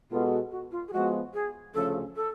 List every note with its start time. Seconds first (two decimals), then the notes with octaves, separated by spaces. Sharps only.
0.10 B2 G#3 B3 F4 F#4 A4
0.51 F#4
0.71 F4
0.88 G#4
0.92 F3 G#3 B3 F#4
1.33 G#4
1.74 D2 C#3 F3 A3 C#4 A4
2.16 A4